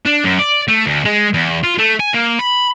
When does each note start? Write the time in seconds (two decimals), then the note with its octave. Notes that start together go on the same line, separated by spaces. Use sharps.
0.06 D4
0.24 F#2
0.39 D5
0.68 A3
0.86 D2
1.05 G#3
1.34 E2
1.64 F4
1.79 A3
2.00 G#5
2.14 A#3
2.39 B5